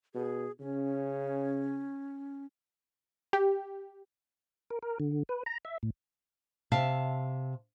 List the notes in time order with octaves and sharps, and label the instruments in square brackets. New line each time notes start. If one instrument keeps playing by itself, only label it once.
[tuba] B2 [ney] G#4
[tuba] C#3 [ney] C#4
[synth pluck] G4
[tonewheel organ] A#4
A#4
D3
B4
A#5
E5
A2
[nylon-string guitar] C3 E5 F5 A5